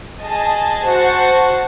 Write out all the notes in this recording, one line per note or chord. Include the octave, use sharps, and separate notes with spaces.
G#4 D#5 A5
F#4 C5 F#5 A5